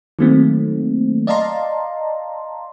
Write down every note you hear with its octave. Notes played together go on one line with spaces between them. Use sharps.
D#3 F#3 A3 A#3 C4
D5 D#5 F5 A5 A#5 C6